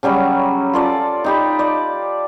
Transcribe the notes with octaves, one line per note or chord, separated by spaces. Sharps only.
C#3 F#3 G3 C#4
F4 A4 D5
D#4 G4 B5
D5